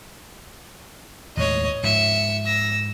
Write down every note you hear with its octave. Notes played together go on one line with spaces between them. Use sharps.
D#2 A2 G#3 C#5 D#5
G#2 F3 E5 C#7
E6 A#6